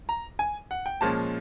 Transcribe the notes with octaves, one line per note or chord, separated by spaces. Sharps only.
A#5
G#5
F#5
G5
A#2 F3 G#3 C#4 A5